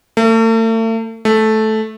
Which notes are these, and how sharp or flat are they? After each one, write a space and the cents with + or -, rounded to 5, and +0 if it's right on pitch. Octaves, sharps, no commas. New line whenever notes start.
A3 +40
A3 -10